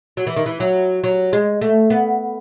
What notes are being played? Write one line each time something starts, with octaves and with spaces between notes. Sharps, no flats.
F#3
E3
D#3
E3
F#3
F#3
G#3
A3
B3